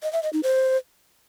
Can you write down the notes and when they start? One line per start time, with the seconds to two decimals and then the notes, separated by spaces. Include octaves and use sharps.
0.03 D#5
0.13 E5
0.23 D#5
0.33 D#4
0.43 C5